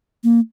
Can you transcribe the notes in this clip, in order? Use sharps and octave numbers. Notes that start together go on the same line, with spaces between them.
A#3